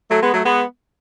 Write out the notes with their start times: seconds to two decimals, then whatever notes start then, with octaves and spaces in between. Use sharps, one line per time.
0.11 F#3 A3
0.22 G#3 B3
0.34 F#3 A3
0.45 G#3 B3